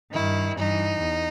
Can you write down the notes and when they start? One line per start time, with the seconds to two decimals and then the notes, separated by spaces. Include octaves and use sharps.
0.12 G2 D#3 E4
0.56 G2 E3 D#4
1.00 E2